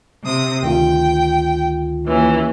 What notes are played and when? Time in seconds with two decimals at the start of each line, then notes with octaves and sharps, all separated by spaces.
0.22 C3 D#6
0.63 D2 D#3 F4 G5
2.05 D#2 E3 C#4